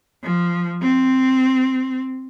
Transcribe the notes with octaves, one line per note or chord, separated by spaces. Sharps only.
F3
C4